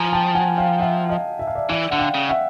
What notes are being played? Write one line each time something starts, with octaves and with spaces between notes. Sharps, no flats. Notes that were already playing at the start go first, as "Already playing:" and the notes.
Already playing: F3 G#5 A#5
G5 A5
F#5 G#5
F5 G5
E5 F#5
D#5 F5
E5
F5
D5 E5
E3 D5 E5
D3 F#5
F5 G5
C#3
E5 F#5